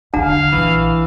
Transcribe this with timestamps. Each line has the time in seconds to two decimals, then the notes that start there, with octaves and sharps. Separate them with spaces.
0.14 E2 D3 D4 F5 F#5 A#5
0.52 A#1 E3